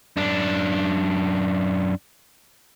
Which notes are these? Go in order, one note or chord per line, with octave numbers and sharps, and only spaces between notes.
F#2 D4